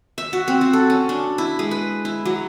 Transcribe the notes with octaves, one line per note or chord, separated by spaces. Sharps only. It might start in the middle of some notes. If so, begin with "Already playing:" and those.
E5
F#4
C4
F#4
A4
C#4
D4
E4
G#3
B4
E4
F#3